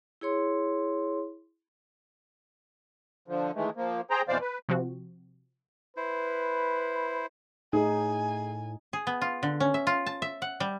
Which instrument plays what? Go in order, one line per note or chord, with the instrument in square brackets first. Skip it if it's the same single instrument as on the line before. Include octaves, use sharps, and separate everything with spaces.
[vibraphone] E4 G#4 C#5 C6
[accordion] D3 F3
D#3 E3 G#3 A3
F3 A#3
G#4 C5 G5 A#5
F2 B2 E3 C5 D5 F5
B4
[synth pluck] C3 F3 C4 F#4
[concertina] E4 C5 [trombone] B4
[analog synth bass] A2 [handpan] D#4 [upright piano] G#4 [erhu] G#5
[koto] G#4
B3
F4
D3
C#4
E5
F4
A5
E5
F#5
G3